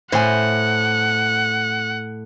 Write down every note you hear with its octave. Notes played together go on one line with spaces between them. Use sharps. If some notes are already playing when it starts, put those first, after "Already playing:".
A2 C5 F#5 G#5